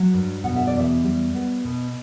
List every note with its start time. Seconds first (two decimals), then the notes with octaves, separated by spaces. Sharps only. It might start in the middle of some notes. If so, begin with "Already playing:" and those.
Already playing: F#3
0.14 G2
0.44 B2 F#5
0.55 E5
0.67 D5
0.74 E2 E5
1.04 G3
1.34 B3
1.64 B2